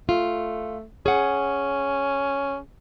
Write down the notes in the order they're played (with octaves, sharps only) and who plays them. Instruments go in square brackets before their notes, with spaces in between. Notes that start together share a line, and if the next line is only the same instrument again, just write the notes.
[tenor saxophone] A3 [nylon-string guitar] F4
[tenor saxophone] C#4 [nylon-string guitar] G#4 F#5